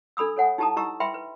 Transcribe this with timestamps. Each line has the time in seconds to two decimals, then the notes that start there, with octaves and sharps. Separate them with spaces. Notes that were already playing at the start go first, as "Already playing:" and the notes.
0.17 D4 A4 B5 D#6 E6
0.36 A4 C#5 F#5 G#5
0.58 D#4 E4 G4 A5 A#5 D#6
0.77 E4 G4 D#5 A#5 C#6 E6
1.00 B4 E5 G5 B5 C6
1.14 B4